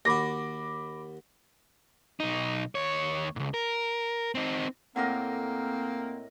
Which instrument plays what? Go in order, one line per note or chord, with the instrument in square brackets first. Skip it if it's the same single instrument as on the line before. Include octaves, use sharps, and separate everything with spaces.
[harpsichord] D#2 F#4 [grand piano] B5 D6 A#6
[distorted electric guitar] B1 D#4
D#2 C#5
C#2 G#2
A#4
C4 D#4
[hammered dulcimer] A2 A#4 D#5 [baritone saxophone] A#3 [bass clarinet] C4 [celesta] F#5 D6